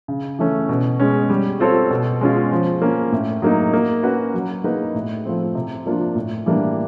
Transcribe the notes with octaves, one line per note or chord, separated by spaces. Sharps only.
C#3
E3 A3 C#4
B2
G#3 C#4
G3
C4 F4 A4 C#5
B2
G#3 C#4 F4
F3
A#3 C#4
A2
F#3 A#3 D#4
A#3
C#4 F#4 B4
F#3
A#3 D#4 G#4 B4
A2
F3 A3 C4
C3
F3 A#3 D4 F4
A2
E3 G3 A#3 D4